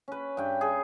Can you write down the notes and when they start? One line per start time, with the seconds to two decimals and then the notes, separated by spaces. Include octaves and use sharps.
0.08 C#4 B4
0.37 G2 G5
0.61 G#4